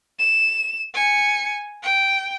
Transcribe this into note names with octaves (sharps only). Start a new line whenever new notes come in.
E7
G#5 C#7
G5